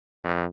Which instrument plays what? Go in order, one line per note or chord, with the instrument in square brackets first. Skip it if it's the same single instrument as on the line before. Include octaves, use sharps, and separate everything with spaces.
[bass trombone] F2